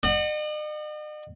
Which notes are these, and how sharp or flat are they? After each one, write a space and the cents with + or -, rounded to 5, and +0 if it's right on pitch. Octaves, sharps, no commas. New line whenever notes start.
D#5 -45 F#5 +0